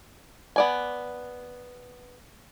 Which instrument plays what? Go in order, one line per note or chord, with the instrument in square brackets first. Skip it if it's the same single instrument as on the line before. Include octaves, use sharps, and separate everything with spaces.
[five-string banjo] B3 D5 G#5